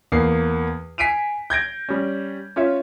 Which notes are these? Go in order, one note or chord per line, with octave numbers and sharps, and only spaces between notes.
E2 A#3 C7
G#5 B6 C7 D7 D#7 F7
G6 G#6 A#6 D7
G3 C#4
C#4 F4 C#5 E5